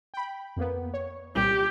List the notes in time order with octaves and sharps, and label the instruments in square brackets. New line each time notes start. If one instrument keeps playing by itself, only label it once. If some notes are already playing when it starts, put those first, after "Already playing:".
[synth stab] G5 B5
F2 A#3 B3
C#5
[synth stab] C2 A#2 G3 [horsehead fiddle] G4